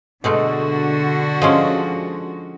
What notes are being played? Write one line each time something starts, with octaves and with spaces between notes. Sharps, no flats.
B2 D3 G#3 A3 F#4
F3 G#3 C#4